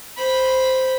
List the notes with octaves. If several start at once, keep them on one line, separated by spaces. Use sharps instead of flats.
C5 B5